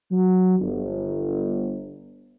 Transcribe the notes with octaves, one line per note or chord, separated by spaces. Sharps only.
F#3
G1